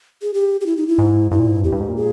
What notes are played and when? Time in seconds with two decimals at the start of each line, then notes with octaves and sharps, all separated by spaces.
0.22 G#4
0.34 G4
0.61 G4
0.66 E4
0.77 D#4
0.88 E4
0.98 G#2
1.31 G2 E4
1.40 A#2
1.48 G#2
1.56 G2
1.64 E2 G4
1.72 G2
1.81 G#2
1.88 A#2
1.96 G#4